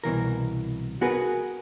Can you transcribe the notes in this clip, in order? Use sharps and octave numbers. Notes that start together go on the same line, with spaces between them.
C2 B2 E3 A#4
B3 F#4 G#4 A#4 B4